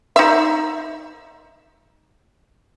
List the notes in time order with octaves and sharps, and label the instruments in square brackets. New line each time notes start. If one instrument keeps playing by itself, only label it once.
[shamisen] D#4 E5